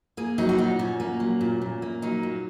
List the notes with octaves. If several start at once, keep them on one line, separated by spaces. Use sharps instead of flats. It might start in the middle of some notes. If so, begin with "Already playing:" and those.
A#3 G#4
F#3 D#4
F#4
A#2 D#4
A#2 C#4
A#3
F#3
A#2
A#2
A#3
F#3 D#4
A#2